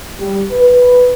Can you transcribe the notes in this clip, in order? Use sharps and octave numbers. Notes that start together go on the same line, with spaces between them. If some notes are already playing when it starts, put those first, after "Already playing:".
G3
B4